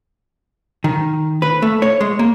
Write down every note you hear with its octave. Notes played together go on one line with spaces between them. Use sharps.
D#3
B4
A3
C#5
G#3
A#3